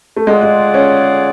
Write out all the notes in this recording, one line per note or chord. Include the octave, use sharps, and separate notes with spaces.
A3
G#3 F4 G#4 D5 F#5
G#3
C#4